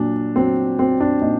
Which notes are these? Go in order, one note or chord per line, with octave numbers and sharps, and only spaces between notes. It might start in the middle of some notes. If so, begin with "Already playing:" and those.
Already playing: A#2 F#3 D4
F#3 C4
F#3 C4
D4
A#2 D#4